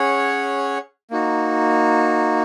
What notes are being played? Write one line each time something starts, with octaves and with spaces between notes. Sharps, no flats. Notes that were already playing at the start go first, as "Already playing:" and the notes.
Already playing: C#4 G#4 C#5 F#5
A#3 D#4 F#4